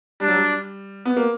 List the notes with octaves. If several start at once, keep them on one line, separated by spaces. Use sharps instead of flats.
G3 D4
F#3
G3
B3
A#3